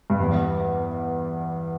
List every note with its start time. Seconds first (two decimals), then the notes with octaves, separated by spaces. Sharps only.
0.10 G2
0.20 E2